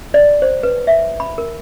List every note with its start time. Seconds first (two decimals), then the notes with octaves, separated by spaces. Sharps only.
0.14 D5
0.42 C5
0.63 B4
0.87 E5
1.20 B5
1.38 A#4